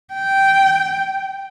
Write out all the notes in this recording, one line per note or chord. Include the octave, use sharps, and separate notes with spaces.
G5